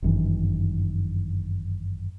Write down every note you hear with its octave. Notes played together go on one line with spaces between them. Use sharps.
G1 F#2 D#3 E3